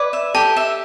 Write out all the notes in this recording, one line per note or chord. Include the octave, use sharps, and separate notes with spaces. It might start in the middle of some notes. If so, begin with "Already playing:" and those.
Already playing: B4 D5 D6
E5
G4 A4 A5
E5